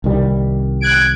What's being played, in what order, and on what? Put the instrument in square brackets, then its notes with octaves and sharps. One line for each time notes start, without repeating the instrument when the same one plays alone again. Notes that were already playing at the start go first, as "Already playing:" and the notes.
[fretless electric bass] C2 D#3 G3
[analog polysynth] F#6 G#6 D7